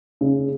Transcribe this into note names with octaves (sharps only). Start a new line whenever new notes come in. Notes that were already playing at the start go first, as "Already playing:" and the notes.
C#3